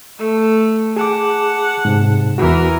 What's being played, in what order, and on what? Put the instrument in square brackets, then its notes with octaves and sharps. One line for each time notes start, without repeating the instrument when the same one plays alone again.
[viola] A3 A4
[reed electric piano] G#4 D6 [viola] F#5 A5
[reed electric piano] G#2 C3
[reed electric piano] E2 F#4 [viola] E3 A#4